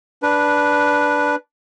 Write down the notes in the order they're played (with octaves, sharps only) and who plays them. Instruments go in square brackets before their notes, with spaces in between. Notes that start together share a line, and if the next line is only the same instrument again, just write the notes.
[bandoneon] D4 B4